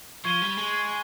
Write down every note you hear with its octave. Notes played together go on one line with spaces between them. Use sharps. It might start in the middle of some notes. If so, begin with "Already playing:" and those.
F3 C#6 G#6 D#7 G7
G3
G#3